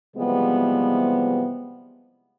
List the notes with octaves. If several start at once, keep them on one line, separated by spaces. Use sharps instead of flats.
C3 E3 F3 G3 G#3 B3